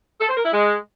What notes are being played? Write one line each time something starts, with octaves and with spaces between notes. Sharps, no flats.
A4
C5
A#4
E4
G#3